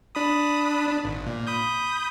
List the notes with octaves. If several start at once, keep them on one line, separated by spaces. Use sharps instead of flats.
D4 B5 D#6
D4
G#1
A#2
B5 D#6 G6